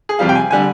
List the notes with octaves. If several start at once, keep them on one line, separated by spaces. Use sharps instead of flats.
G#4
F2 C3 G3 F5
G5
G#5
D3 G3 G#5